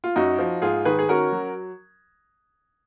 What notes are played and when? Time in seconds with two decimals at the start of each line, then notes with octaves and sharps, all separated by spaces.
0.04 F4
0.16 F#2 D#4 F#4
0.39 F3
0.62 G#2 F4 G#4
0.85 D#3 G#4 B4
0.99 G#4
1.09 C#4 F#4 A#4
1.32 F#3